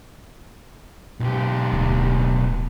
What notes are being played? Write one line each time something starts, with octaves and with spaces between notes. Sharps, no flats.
B1 G4
D1